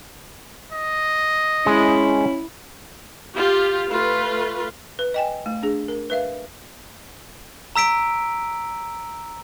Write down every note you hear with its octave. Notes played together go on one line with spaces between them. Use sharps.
D#5
G#3 C#4 E4
F4 G4
A3 F4 B4
B4
D#5 G5 G#5
A3
D4 G#4
A#4
B4 E5 F5
A#5 E6 B6 D7